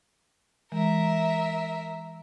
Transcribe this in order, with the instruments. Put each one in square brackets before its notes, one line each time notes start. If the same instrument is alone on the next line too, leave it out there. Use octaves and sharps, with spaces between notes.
[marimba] E3 G#3 [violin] A#4 E5